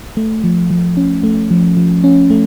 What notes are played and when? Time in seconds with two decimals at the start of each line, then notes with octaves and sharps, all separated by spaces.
0.17 A3
0.44 F3
0.70 F3
0.97 C#4
1.24 A3
1.51 F3
1.77 F3
2.04 C#4
2.30 A3